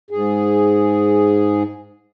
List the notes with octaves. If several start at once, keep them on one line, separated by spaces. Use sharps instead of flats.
G#2 G#4